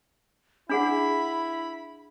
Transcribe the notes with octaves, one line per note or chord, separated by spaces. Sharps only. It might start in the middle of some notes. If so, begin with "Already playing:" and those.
D4 E4 G#4 F#5 B5